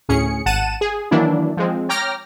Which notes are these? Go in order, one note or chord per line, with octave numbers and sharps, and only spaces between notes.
D2 A2 C#4 G#4 C#7
G#1 F#5 A5 D#7 E7
G#4
D#3 E3 F#3 A#3 D4 E4
F3 G#3 C4
C#5 G5 A#5 D6 F6 A#6